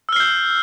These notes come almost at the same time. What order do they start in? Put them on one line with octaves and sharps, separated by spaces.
E6 F6 C7 G6